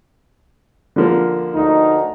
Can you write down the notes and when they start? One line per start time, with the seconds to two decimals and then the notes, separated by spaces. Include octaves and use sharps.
0.96 D3 F3 A#3
1.54 D2 D#4